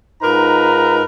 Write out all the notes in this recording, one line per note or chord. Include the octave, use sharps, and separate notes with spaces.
G#2 D#4 F4 A#4 B4 A#5